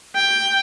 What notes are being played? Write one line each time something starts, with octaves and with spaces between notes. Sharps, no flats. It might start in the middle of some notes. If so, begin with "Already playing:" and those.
G5